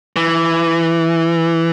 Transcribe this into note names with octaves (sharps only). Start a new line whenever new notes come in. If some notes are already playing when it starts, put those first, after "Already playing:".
E3